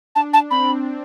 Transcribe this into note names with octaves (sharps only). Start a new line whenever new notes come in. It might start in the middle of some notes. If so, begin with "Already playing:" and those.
D4 A5
A5
C4 B5